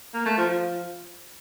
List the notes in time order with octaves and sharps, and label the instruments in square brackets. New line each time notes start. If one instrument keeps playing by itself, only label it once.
[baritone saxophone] A#3
A3
F3
F3